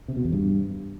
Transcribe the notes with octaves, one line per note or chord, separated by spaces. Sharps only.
C3
B2
E2
G2